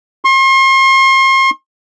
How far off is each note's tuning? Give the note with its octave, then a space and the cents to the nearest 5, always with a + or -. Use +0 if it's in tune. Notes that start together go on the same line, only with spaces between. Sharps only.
C6 +40